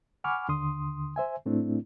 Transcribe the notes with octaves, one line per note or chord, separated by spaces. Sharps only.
F#5 G#5 B5 C#6 D6 F6
D#2 D3 C6 D#6
C5 E5 G#5
A2 A3 C4 D4 E4